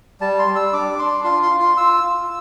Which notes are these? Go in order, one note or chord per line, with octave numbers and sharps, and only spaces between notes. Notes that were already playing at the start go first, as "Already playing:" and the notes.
G3 A5
C6
G3
E6
D4 D6
D4 C6
F4 C6
C6
F4
C6
F4 E6
F4